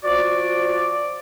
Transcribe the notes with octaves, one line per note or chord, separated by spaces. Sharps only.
F3 F#4 D5